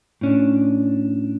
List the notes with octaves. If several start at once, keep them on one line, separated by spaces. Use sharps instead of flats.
A2 C#4 D4